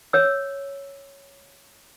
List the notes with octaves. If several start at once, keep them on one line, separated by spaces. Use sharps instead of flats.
C#5 E6